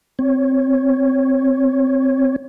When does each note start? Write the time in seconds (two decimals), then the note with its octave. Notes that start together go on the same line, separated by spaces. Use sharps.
0.19 C4 C#5